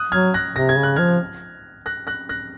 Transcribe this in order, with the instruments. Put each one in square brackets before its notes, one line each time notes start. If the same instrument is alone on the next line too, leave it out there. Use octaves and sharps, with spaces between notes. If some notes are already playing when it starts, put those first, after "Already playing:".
Already playing: [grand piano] D#6 F#6
[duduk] F#3 [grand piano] F6 G#6
[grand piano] F#6 A#6
[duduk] C3 [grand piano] A#6
[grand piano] G#6
[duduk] C#3
[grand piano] F#6
[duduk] F3 [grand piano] F6 G#6
[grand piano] F#6 A#6
F#6 A#6
F#6 A#6